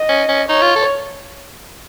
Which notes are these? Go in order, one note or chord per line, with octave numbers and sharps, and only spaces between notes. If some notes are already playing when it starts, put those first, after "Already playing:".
Already playing: D#5
C#4
C#4
D#4 C#5
F4
A4